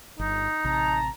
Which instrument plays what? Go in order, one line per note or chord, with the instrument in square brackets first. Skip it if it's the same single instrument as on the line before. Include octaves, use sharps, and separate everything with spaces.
[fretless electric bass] G1 [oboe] D#4
[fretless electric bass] A1 C3 [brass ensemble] A5 A#5